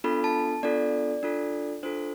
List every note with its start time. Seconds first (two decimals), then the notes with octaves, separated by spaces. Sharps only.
0.04 B3 D4 F4 A4 B5
0.24 A5
0.63 B3 D4 F4 A4 D5
1.23 D4 F4 A4
1.83 D4 F4 A4 C5